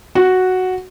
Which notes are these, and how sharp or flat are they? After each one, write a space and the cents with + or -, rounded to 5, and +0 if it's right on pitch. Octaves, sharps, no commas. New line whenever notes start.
F#4 +0